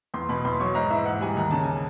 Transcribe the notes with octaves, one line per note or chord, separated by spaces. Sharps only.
E2 C6
B2 B5
E2 C6
F#3 C#6
G#2 A#5
E3 E5
G#2 F#5
G3 G#5
D#2 A#5
C#3 A5
G#5